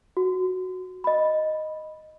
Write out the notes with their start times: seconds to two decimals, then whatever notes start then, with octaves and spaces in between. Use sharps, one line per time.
0.17 F#4
1.04 D#5 B5